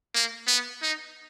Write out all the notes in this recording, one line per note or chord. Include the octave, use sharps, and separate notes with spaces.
A#3
B3
D#4